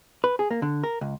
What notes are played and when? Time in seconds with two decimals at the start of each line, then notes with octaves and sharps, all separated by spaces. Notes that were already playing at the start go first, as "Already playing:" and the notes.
0.24 B4
0.39 G#4
0.51 A#3
0.62 D3
0.84 A#4
1.01 C#2